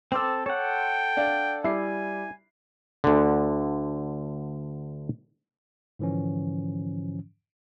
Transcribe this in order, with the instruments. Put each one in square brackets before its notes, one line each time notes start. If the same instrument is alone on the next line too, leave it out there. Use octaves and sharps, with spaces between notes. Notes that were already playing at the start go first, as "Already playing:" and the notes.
[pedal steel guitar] C4 A4 [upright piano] C6 D6 E6
[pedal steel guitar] A4 F#5 [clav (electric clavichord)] C#5 [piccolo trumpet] G5
[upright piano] D4 D5 F5
[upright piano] G3 D6 C7 [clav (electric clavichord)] E4 E5 [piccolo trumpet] G#5
[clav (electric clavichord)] D2 D3
[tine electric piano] G#2 D3 E3 F3 C#4